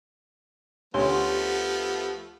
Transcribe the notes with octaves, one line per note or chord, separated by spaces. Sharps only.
D2 F3 A3 B3 C#4 G4 C#5 C6